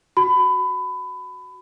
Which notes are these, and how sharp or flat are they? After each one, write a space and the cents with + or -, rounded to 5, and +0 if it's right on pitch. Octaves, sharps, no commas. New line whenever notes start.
F#4 +0 B5 +20